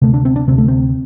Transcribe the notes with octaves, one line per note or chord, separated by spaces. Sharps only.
D2 C3 A3
D4
C4
D4
D2 C3 C4
A3
C4